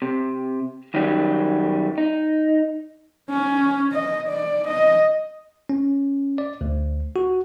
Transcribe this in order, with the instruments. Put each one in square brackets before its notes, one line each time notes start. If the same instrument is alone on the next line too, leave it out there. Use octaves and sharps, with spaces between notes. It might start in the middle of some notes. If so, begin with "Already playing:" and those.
[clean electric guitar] C3
F#2 D#3 F#3 G3
D#4
[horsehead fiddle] C#4
D#5
D5
D#5
[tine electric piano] C#4
D5
D2
F#4